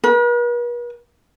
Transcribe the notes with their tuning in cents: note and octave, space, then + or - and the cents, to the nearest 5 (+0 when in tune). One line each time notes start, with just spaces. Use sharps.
B4 -45